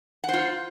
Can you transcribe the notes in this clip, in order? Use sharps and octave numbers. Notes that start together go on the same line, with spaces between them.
F4 C5 F#5